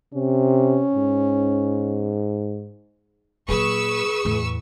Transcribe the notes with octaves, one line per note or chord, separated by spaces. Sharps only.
C3 C#4
G#2
A#2 F#3 G#4 B4 C#6 E6
E2 A2